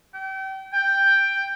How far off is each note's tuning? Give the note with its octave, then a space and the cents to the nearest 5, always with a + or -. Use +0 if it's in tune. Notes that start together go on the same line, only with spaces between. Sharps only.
G5 -30
G5 +5